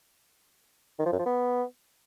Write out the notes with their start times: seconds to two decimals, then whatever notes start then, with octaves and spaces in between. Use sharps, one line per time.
0.99 D#3
1.06 F3
1.12 F#2
1.19 F3
1.26 B3